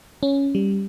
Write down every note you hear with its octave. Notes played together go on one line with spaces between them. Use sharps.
C#4
G3